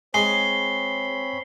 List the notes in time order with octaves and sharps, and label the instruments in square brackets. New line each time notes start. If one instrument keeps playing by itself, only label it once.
[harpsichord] G#3 [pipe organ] C4 C#5 B5 [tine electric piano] G#5 [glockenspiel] C7 G7